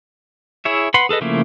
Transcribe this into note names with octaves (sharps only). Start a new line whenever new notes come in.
E4 G#4 C#5 E5
B4 F#5 B5 C6
G#4 A4 B4 D#5
C#3 F3 A3 A#3 E4